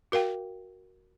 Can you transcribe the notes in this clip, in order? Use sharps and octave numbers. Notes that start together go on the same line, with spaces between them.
F#4 A#4 F5 G5